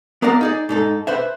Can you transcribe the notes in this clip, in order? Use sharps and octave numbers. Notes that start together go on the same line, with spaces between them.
B3 A#4 D5 F5 A#5
D#4 G#4 D5
G#2 D#4 A4
B4 C5 E5